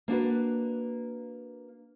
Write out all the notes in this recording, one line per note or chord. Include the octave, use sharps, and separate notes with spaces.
A#3 D4 F#4 B4